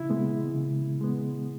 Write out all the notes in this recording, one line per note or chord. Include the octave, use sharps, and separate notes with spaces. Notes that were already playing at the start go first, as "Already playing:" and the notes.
Already playing: C#3 E4
G#3 B3
C#3
G#3 B3